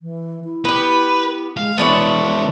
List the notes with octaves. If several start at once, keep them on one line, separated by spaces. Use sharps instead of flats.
E3
E4
B3 G4 B4
G#3 F5
E3 G#3 B3 D4 C#5 E5